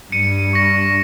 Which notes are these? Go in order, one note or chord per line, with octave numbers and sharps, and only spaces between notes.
G2 C#7 D#7
C#6 A#6